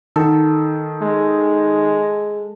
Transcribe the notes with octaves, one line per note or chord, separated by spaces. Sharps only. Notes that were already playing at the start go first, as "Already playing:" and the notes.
D#3 A4
G#3